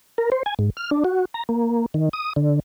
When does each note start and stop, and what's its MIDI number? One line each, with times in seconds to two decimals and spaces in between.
0.18 0.30 70
0.32 0.43 72
0.46 0.54 80
0.59 0.70 44
0.77 0.90 89
0.91 1.04 62
1.04 1.25 66
1.34 1.44 82
1.49 1.86 58
1.94 2.09 51
2.13 2.33 87
2.36 2.60 50